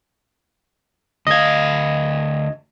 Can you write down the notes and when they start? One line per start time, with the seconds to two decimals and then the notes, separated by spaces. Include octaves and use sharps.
1.27 D2 D#5 F5 G#6